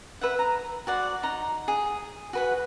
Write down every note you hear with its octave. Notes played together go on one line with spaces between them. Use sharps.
B4 E5 F#5
A#5
F#4 C5 D5 F#5
D#4 F#5 A#5
G#4
F#4 B4 F#5